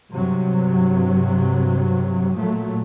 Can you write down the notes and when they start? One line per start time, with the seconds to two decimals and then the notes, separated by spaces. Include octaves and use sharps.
0.14 G2 C3 F#3
2.36 A#2 F#3 A3